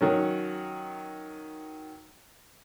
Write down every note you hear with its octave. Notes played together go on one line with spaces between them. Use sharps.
D#3 F#3 C#4